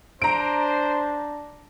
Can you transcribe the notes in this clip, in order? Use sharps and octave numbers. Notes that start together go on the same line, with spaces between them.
D4 C5 A#5 D7